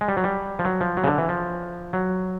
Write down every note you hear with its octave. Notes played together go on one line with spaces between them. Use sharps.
G#3
G3
F#3
G3
F3
F#3
F3
F#3
C#3
D3
E3
F3
F#3